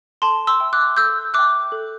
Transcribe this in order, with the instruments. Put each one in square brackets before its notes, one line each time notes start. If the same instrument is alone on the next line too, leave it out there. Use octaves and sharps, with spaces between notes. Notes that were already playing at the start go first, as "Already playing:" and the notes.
[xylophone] A4 A5 C6
C6 E6
E5 G5
D6 F#6
A4 E6 G6
E5 G5 D6 F#6
A4